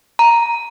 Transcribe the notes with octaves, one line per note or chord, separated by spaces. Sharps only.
A#5